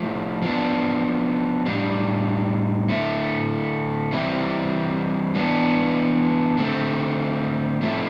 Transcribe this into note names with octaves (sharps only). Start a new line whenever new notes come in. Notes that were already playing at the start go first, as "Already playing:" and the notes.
Already playing: F3 A3 E4
F3 B3 D4
A2 G3 D4
D3 A3 E4
E3 G3 C4 E4
E3 B3 D4
D3 A3 C4
F3 A3 C4 E4